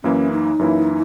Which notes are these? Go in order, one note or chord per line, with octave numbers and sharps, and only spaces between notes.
F#2 E3 A#3 C#4 E4
D#4
F#2 E3 A#3 E4